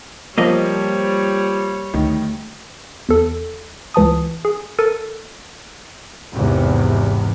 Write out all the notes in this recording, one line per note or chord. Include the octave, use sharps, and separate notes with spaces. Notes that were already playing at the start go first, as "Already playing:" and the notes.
F3 G3 A#3 C#5 D#5
D2 D#3
E2 A4
C#2 E3 A5 D#6
G#4
A4 A#4 A6 D#7
G#1 E2 C3